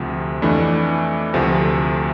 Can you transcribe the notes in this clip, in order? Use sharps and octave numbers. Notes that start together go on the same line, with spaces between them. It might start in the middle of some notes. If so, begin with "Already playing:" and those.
Already playing: D2 C3 F3
F2 E3 A3 D4
D2 C3 F3 A3